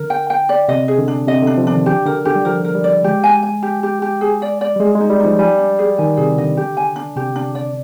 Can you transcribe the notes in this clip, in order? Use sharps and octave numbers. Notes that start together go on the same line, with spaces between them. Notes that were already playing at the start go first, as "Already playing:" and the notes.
Already playing: D3 A#4
G5
G5
D5
C3 D#5
G#4
D3
D4
C3 D#5
D3 D4
F3
D4
D#3
G4
D3 A#4
D3 G4
G3
F3 A#4
A#4
G3
D5
G#3 G4
G#5
G#5
G4
G4
G4
G#4
D5
D5
G3
G#3 G#4
G#3 D#4
G3
D#4
F3
G3 G#5
D4
G#4
D#3 G#5
C3 G#4
D3 D#5
G4
G#5
D4
C3 G4
D4
D5